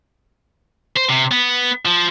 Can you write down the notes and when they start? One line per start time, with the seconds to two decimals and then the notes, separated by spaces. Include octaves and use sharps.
0.96 C5
1.09 C3
1.31 B3
1.85 F3